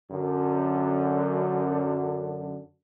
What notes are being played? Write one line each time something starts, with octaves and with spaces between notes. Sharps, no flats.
F#2 D3